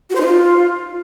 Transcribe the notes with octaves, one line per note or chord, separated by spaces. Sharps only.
F#4
C5
D#4
F4